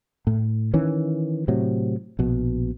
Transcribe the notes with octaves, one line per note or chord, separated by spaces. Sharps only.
A2
D#3 E3 C#4
A2 C3 F#3
A#1 B2